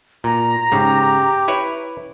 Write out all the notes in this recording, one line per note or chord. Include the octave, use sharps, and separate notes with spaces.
A#2 A#5
G#2 C#3 G4
E4 B4 C#5